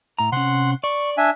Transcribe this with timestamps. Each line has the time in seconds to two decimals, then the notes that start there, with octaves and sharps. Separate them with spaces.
0.19 A2 A#5
0.32 C3 C#4 F#5 C6
0.84 D5 C#6
1.17 D4 E5 G#5